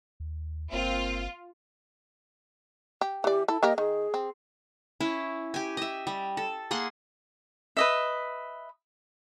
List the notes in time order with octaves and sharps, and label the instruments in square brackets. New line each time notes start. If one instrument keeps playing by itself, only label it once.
[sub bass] D#2
[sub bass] G1 [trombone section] A#3 C4 [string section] F4
[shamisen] G4
[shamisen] E3 D5 [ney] G4
[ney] E4 [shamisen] A4
[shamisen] A#3 G4 A#4 [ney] D#5
[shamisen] D#3 [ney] G#4
[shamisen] C4
[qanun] C#4 E4
G4 G#5
D#5 E5
G3
A4
A#3 G#4 F#5 C6
[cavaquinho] B4 D#5 E5